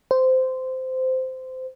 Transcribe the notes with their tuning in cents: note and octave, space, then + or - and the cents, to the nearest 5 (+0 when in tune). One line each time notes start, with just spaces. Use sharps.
C5 -15